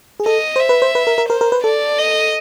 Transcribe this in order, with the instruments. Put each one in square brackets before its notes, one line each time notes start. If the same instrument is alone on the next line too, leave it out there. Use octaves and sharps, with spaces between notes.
[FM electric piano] G#4
[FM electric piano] A4 [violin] D#5
[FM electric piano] C5 [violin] E5
[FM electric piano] B4
C5
B4
A#4
A#4
[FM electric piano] A#4 [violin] C5
[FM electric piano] A#4
B4
[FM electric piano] A4 [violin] D5
[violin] D#5